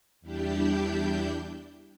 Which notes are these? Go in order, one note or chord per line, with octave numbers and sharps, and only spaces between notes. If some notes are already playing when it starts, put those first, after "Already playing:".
E2 G3 D4 E4 G4 G6